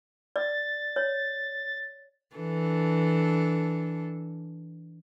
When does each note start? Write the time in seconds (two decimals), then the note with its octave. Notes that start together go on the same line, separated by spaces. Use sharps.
0.36 D5 A6
0.96 C#5
2.36 E3 D4 A4